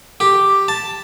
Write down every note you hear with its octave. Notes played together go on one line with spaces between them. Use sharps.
G4
A5